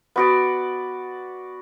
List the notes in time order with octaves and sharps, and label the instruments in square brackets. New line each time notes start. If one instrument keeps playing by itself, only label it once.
[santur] B3 F#4 D5